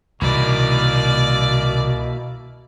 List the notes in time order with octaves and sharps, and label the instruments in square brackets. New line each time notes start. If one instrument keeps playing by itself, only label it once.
[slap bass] C2 D#3 E3 [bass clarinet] B2 [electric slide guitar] A#3 E4 A#4 [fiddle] D5